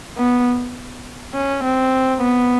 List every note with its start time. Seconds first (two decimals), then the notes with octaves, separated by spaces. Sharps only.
0.17 B3
1.34 C#4
1.63 C4
2.21 B3